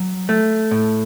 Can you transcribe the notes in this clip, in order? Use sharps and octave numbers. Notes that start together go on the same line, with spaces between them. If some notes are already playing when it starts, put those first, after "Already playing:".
Already playing: F#3
A3
A2